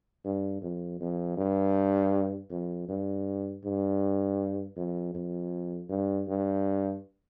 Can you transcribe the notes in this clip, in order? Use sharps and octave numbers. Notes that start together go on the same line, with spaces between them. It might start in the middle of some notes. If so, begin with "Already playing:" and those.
G2
F2
F2
G2
F2
G2
G2
F2
F2
G2
G2